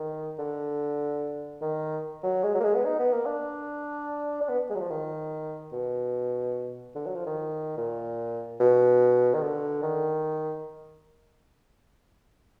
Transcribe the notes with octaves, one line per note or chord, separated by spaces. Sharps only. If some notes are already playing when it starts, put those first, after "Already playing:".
Already playing: D#3
D3
D#3
F#3
G#3
F#3
A#3
G#3
B3
D#4
B3
A#3
D4
D4
B3
G#3
F#3
F3
D#3
B2
D3
F#3
F3
D#3
A#2
B2
D#3
D3
D#3